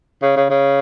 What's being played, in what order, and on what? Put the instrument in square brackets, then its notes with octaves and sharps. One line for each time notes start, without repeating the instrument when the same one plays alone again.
[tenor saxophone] C#3
C#3
C#3